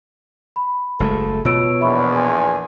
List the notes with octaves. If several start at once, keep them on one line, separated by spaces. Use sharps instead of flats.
B5
F#1 G#3 A3 A4
B2 F4 C#5 E6 D7
A#1 E2 E5 B5 C#6
G#5 C6